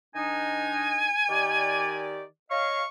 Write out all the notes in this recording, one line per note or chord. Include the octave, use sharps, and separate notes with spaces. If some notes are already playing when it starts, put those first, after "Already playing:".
D#3 D4 D#4 G#5
D#3 G4 D5
C#5 D#5 F5 C#6